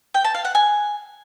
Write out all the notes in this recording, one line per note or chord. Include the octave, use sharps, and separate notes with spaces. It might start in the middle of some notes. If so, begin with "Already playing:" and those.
G5
A5
F5
F#5
G#5